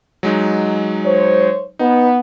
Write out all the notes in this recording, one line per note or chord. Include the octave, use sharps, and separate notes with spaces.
F#3 G#3 D#4
C5 C#5
B3 D#4